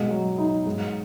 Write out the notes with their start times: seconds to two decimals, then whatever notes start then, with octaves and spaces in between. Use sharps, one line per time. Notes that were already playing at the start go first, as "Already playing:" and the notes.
Already playing: B2 G#3
0.11 F#3
0.38 D#4
0.66 G#2